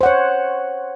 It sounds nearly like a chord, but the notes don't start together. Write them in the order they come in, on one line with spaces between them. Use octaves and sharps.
C5 F#5 C#5